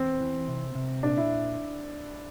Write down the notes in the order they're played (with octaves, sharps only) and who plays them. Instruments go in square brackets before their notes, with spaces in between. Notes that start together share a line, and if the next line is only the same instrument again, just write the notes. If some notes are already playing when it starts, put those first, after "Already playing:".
Already playing: [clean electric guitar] E2 [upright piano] C4
[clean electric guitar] E3
C3
C3
[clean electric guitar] A#2 [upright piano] D4
[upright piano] E4